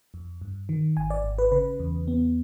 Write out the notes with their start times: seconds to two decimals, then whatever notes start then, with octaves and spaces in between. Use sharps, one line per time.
0.14 F2
0.41 G2
0.69 D#3
0.97 G#1 G#5
1.10 D5
1.24 G#1
1.38 B4
1.52 C#3 B4
1.79 E2
2.08 B3